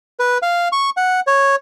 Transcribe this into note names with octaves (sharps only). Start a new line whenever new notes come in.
B4
F5
C#6
F#5
C#5